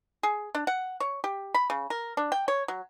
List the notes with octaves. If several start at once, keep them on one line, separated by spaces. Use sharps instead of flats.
G#4
D4
F#5
C#5
G4
B5
C#3
A#4
D4
G5
C#5
F#3